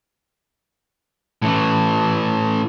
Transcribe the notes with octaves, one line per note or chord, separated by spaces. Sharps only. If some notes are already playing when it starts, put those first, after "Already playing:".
A2 E3